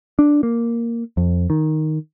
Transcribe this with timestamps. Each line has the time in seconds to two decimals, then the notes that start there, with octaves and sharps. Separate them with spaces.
0.19 D4
0.43 A#3
1.17 F2
1.50 D#3